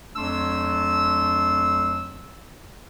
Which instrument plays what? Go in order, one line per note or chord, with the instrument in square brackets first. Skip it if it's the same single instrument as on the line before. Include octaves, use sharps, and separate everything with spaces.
[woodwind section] F2 F#3 A3 D4 C6 E6